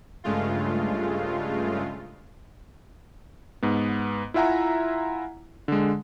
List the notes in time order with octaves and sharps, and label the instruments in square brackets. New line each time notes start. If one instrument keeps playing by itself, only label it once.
[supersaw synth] G2 C#3 G#3 A3 F4
[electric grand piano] G#2 B3
E4 F4 E5 F#5 G#5 A#5
D3 G#3